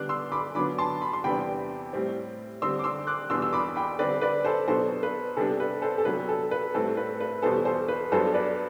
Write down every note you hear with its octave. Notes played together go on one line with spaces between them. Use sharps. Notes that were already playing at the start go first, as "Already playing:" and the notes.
Already playing: D3 G3 B3 D4 D6 F#6
C6 E6
B5 D6
D3 F#3 B3 D4 B5 D6
A5 C6
B5
C6
E2 C3 G3 B3 D4 G5 B5
A2 G3 C4
D3 G3 C4 C6 E6
D6
C6 E6
D6 F#6
E2 B2 G3 D4 C6 E6
E6
B5 D6
G5 B5
D3 G3 C4 B4 D5
B4 D5
A4 C5
B2 F#3 B3 D4 A4 C5
B4
C3 G3 B3 D4 A4
B4
A4 C5
A4
C3 F#3 B3 D4 B4
A4
B4
A2 G3 C4 A4
B4
B4
E2 B2 G3 B3 A4 C5
A4 C5
B4
G2 F#3 B3 D4 A4 C5
B4 D5